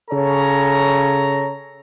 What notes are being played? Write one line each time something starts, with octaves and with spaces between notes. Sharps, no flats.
C#3 A4 C#5 A#5